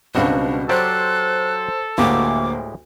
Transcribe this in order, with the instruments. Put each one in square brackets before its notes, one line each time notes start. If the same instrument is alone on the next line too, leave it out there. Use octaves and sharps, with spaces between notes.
[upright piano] C#2 C4 [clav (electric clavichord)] B2 G3 F#4 [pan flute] D4
[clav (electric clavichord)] F#3 G4 D5 [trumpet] A4 [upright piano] C5 [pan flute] F#6
[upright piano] D2 A#3 F#4 [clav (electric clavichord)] A2 G#3 G4 [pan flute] D6